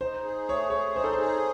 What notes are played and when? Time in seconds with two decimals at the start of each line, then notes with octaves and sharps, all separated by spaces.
0.01 D#4 C5
0.24 G#4
0.49 A3 C#5
0.70 G#4 C#5
0.96 D#4 C5
1.04 A4
1.13 C5
1.20 G#4